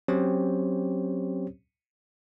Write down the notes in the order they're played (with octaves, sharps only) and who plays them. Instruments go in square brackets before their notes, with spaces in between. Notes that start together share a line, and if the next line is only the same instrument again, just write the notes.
[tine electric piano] F#3 C4 C#4 G4 C5 C#5